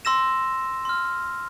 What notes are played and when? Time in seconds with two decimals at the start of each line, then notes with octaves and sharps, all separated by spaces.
0.05 C6 E6 A#6 E7
0.85 C6 F6